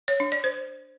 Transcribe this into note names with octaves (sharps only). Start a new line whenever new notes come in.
C#5
D4
D5
C5